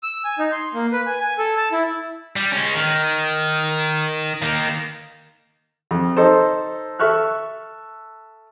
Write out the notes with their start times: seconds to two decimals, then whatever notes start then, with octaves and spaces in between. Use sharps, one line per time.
0.03 E6
0.25 G#5
0.39 D#4
0.52 C6
0.74 A#3
0.92 B4
1.06 G#5
1.20 G#5
1.38 A4
1.57 A5
1.72 E4
2.36 G3
2.52 G#3 C#4
2.75 D#3
4.43 D#3 A#3
5.91 F2
6.17 D#4 A4 C5
6.99 A4 E5 C#6 F6 F#6